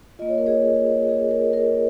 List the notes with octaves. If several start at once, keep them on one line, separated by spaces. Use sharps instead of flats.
A#3 F4 D#5
C#5
A#4
G#4 C#5
G#4
A#4
A#4